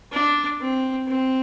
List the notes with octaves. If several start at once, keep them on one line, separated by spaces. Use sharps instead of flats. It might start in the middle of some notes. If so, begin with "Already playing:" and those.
D4
C4
C4